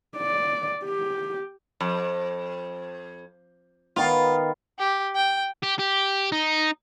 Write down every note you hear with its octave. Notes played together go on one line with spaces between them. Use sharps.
D5
G4
F2
D#3 B3 F4
G4
G5
G4
G4
D#4